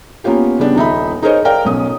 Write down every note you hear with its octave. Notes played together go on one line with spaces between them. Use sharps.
A#3 B3 C#4 F4 G4
C#3 G3 B3 D4 G4
D#1 D#4 E5 B5
D#4 G#4 A#4 C5 C#5 D#5
A#4 D5 F5 G5
B1 B2 C#4 D#6